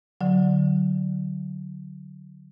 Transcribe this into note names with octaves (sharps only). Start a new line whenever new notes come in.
D3 F#3